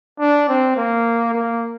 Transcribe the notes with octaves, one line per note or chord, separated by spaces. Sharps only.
D4
C4
A#3
A#3